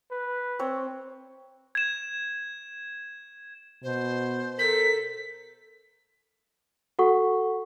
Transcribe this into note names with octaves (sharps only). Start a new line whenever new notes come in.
B4
C4 C#5
G#6 E7
B2 C5
A4 A#4 B6
F#4 A4 F#5 C#6